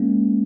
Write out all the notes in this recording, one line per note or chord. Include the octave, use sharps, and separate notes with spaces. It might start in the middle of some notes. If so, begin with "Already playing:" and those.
Already playing: G#3 A#3 C#4